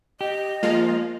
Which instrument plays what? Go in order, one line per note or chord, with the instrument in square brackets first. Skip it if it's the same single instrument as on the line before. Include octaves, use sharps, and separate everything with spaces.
[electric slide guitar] G4 [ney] D#5
[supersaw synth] F3 G#3 F4 [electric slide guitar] A#3